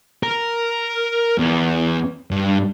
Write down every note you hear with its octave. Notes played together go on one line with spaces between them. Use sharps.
A#4
E2
G2